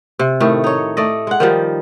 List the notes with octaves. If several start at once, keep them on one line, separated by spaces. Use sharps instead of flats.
C3
A2 D#3 A3
D#4 C#5
A3 D5 D#5
G#3 F#5
D#3 F3 G3